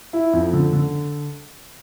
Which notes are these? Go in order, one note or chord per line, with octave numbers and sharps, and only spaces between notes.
E4
F2
D3
D3